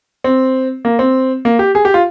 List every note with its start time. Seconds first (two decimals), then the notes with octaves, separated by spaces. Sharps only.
0.24 C4
0.85 A#3
0.99 C4
1.45 A#3
1.59 G4
1.75 G#4
1.85 G4
1.94 F4